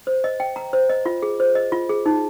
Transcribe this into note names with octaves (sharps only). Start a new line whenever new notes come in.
C5
D#5
G5
A#5
C5
D#5
F4
G#4
C5
D#5
F4
G#4
D#4